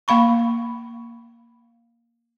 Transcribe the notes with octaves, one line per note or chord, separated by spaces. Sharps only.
A#3 F5 B5 C#6